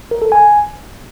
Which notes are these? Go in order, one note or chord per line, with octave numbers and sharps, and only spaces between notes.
A#4
A4
G#5